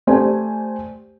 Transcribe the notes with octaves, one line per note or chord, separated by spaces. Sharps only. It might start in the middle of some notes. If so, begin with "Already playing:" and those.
A3 G4 C5 D5 G#5